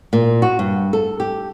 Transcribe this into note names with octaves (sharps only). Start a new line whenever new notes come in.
A#2
F#4
G2
A4
G4